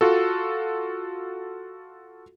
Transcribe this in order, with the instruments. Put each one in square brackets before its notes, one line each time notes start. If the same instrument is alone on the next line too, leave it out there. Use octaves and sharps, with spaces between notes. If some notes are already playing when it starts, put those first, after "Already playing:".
[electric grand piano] F4 F#4 A4